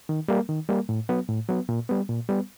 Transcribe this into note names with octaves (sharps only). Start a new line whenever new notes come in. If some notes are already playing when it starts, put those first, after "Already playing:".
D#3
G3 A#3
D#3
G3 A#3
A2
F#3 B3
A2
F#3 B3
A#2
G3 B3
A#2
G3 B3